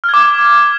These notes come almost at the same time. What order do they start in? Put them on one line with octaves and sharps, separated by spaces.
F6 G#6 D6